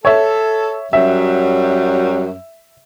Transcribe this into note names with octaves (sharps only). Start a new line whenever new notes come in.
A4 C#5 E5
F#2 F#3 G3 E5